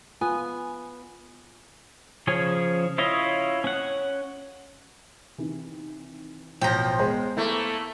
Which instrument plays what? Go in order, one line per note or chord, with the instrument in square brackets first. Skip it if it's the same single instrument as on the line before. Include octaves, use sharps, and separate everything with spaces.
[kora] B3 [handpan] F4 [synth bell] G#5
[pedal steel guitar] C#3 F3 C#4 G#4 C#5
C#4 E4 F4 C#5 D#5
C#4 F#5
[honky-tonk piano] C3 D#3 E3
[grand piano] A1 B2 [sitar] F3 [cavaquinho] G5 A#5
[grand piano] G#3 [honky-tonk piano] B3 G#4 C5
[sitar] A3 A#3 [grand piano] E4